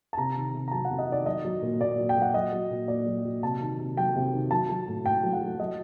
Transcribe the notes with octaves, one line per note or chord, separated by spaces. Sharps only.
A5
C3 A#5
D#3
C3
A#5
F#3 A5
F#5
C3
D#5
D#3 D5
F#3 D#5
F#3
A#2
A#2 D5
F#3
G5
F#3
F#5
F#3 D#5
F#3
A#2
A#2 D5
F#3
F#3
C3 A5
D#3
C3
F#3 G5
C3
D#3
F#3 A5
F#3
A2
A2 G5
F#3
F#5
F#3
F#3 D#5